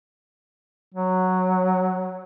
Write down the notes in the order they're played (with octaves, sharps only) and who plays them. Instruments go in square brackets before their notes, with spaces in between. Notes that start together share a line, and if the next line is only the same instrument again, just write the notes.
[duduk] F#3